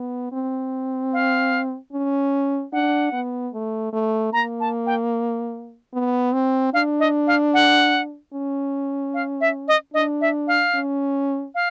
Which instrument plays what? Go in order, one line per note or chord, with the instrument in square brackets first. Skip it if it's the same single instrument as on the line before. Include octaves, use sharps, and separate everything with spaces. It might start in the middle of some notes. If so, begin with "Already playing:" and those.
Already playing: [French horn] B3
C4
[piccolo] F5
[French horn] C#4
[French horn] D4 [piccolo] F#5
[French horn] B3
A3
A3
[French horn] A#3 [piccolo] A#5
[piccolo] A5
G5
[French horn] B3
C4
[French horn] D4 [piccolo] F5
[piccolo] D#5
F5
F#5
[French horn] C#4
[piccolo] F5
E5
D#5
[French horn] D4 [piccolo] D#5
[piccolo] E5
F5
[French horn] C#4
[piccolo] F5